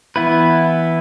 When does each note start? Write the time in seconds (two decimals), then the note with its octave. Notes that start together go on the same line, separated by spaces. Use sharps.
0.16 E3 B3 E4 B4